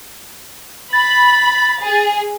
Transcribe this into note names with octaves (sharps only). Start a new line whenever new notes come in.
B5 A6
G#4